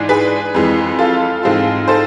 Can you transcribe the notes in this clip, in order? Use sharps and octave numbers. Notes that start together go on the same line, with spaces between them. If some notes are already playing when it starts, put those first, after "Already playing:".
Already playing: G#2 E3 G#3 D4
G#4 B4
F2 E3 G#3
F4 A4
G#2 E3 G#3 C4 F4
A4 C5